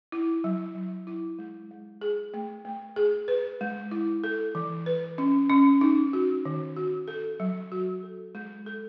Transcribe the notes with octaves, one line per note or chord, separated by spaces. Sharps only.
E4
F#3
F#3
E4
G#3
G#3
G#4
A3
A3
G#4
B4
G#3
E4
A4
E3
B4
C#4
C#4
D#4
F#4
D#3
F#4
A4
F#3
F#4
A4
G#3
A4